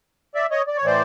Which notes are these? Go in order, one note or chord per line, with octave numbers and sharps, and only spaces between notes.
D5 E5
C#5 D#5
D5
C#5
A2 E3 C5 D5